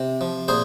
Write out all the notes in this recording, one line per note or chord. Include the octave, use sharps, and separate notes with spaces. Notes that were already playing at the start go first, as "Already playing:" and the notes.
Already playing: C3
F3
A#2 G#4 C5